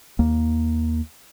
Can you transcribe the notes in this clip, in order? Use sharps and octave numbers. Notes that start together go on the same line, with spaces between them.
D#2 A#3